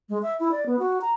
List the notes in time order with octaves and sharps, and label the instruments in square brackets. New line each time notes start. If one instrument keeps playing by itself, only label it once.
[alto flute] G#3
E5
E4
D5
B3
F#4
A#5